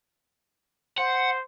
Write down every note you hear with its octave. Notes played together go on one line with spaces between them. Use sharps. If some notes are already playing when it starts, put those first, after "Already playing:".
C5 F#5